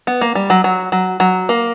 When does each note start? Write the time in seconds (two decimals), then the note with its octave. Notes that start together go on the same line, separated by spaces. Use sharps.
0.07 B3
0.21 A#3
0.35 G3
0.50 F#3
0.64 F#3
0.92 F#3
1.20 F#3
1.49 A#3